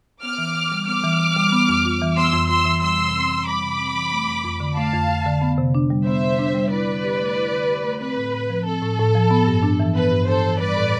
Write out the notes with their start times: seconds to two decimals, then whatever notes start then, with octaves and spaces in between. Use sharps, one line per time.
0.23 B3 D6 F6
0.38 E3
0.55 E3
0.72 G3
0.87 B3 D6 F6
1.04 E3
1.20 E3
1.36 G3
1.52 B3
1.69 F2
1.85 F4
2.02 E3
2.17 B3 C6 E6
2.33 F2
2.50 F4 C6 E6
2.66 E3
2.82 G3 C6 E6
2.99 C3
3.15 C4
3.30 E3
3.47 G3 B5 D6
3.64 C3
3.79 C4
3.95 E3
4.12 A3
4.28 F2
4.45 F2
4.60 D3
4.76 A3 F5 A5
4.93 F2
5.08 F2
5.26 D3
5.42 B3
5.58 C3
5.75 D4
5.90 G3
6.06 B3 C5 E5
6.22 C3
6.39 D4
6.54 G3
6.71 E4 B4 D5
6.87 D3
7.04 G4
7.20 A3
7.36 E4
7.52 D3
7.69 G4
7.85 A3
8.00 C4 B4
8.17 A2
8.33 A2
8.50 F3
8.66 C4 A4
8.82 A2
8.99 A2
9.15 F3
9.31 B3
9.47 G2
9.63 D4
9.80 E3
9.95 B3 B4
10.12 G2
10.28 D4 A4 C5
10.45 E3
10.60 G3 B4 D5
10.77 A2